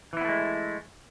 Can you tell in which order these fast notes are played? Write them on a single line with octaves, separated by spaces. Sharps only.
E3 E4 B3 A3 G#3